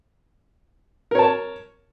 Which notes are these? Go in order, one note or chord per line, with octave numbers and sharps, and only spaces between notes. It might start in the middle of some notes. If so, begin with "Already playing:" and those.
A#4 C#5 A5